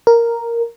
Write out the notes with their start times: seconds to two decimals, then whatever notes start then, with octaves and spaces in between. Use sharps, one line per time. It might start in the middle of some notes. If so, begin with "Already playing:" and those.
0.07 A#4